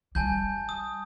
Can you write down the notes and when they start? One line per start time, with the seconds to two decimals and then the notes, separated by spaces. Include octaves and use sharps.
0.15 G3 G#5 A5 G6
0.69 D#6